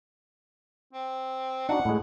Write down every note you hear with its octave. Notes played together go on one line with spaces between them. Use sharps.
C4
D4 D#4 F#4 F#5
A2 G#3